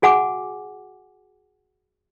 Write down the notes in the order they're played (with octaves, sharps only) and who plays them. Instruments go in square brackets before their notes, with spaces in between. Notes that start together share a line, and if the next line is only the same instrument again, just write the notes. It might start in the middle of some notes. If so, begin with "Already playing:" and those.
[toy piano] F#4 G#4 F#5 G#5 D6